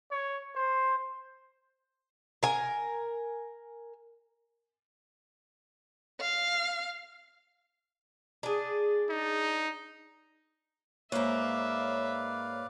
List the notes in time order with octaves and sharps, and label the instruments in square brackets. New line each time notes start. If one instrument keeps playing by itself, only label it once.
[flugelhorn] C#5
C5
[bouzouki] A#4 G#5
[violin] F5
[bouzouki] D4 G#4
[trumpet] D#4
[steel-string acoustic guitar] G#2 A#3 [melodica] B4 D5 F5 [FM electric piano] C#5 [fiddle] E5